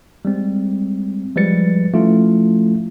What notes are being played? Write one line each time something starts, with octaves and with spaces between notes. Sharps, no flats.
G3 G#3 C4
F3 G3 G#3 B4 A6 C#7
F3 A3 C#4 E4 F4